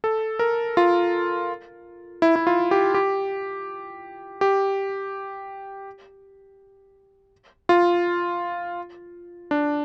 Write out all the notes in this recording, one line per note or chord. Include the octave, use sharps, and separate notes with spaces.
A4
A#4
F4
E4
E4
F4
G4
G4
G4
F4
D4